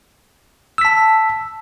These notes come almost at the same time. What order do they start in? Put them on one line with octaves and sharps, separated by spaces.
E6 B6 A5